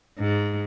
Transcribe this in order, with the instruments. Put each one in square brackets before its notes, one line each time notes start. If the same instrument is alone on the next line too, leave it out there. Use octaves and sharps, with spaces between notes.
[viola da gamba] G#2